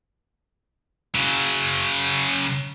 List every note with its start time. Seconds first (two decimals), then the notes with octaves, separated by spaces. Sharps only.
1.15 C#3 F#3